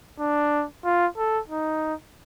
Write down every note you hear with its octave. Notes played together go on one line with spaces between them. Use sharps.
D4
F4
A4
D#4